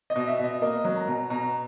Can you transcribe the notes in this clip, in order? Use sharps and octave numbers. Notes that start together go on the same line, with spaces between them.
D#5
B2
E5
B2
D#5
A#3 D#5
F#3
A#5
B2
B2 A#5